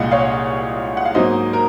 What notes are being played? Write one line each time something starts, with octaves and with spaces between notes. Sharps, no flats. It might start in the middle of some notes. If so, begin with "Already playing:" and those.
Already playing: C2 A#2 G#3 D#5 F5 F#5
C#5 F5
F#5
F5
G#2 F#3 A#3 C5 D#5
A#4